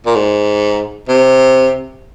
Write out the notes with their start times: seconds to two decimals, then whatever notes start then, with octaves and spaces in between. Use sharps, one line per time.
0.06 A#2
0.15 G#2
1.09 C3